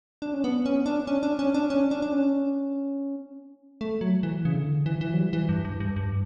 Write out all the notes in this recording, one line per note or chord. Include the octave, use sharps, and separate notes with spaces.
D4
C#4
B3
C#4
D4
C#4
D4
C#4
D4
C#4
D4
D4
C#4
A3
F#3
E3
C#3
D3
E3
E3
F#3
G3
E3
G2
G2
G2
G2